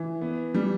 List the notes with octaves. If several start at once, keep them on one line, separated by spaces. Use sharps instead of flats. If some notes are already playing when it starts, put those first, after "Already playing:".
Already playing: E3
B3
G3